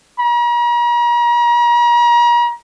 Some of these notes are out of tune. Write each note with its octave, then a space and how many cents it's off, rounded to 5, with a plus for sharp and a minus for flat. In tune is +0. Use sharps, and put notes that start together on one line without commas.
A#5 +40